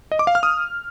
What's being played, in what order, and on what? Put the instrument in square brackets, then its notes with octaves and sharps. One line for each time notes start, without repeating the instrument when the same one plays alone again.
[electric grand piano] D#5
D6
F5
F6
D#6